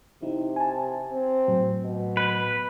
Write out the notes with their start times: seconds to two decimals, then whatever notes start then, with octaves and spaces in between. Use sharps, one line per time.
0.23 C3 D#4 E4
0.56 G#5 A5
1.09 C4
1.48 A2 F#3
1.84 B2
2.17 B4